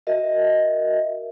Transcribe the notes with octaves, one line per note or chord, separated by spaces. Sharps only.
F#4 A#4 D#5 E5